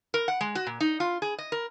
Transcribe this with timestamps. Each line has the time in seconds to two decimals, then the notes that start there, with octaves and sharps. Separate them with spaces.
0.14 A#4
0.28 F#5
0.41 G#3
0.55 F#4
0.67 A#2
0.80 D#4
1.00 F4
1.22 G#4
1.38 D#5
1.52 A#4